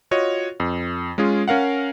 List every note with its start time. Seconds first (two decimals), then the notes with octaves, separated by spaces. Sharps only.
0.11 F4 F#4 C#5 D#5
0.60 F2
1.18 G#3 C#4 F4 G#4
1.48 C#4 A#4 F5 F#5